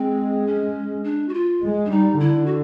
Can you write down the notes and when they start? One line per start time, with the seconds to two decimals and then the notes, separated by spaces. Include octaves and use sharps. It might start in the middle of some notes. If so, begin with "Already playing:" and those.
Already playing: G#3 C4
0.47 C#4
1.04 D4
1.29 F#4
1.34 F4
1.63 G#3
1.86 D4
1.91 G3 D#4
2.20 D3 E4
2.46 F#4